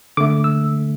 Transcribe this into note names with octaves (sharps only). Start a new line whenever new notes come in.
D3 A3 D6
E6